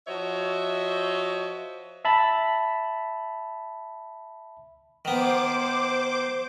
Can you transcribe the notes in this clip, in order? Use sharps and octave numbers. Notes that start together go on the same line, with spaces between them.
F3 F#4 C5 C#5 D#5 E5
E5 A5 B5
D#3 B3 C5 D6